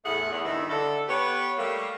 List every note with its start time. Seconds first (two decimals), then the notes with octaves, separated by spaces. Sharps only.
0.05 E2 A2 A3 G#4 F#5
0.31 E2
0.45 G2 D#3 E4
0.69 D3 A4
1.08 B3 G4 B4 C#5
1.57 G3 A3 A#3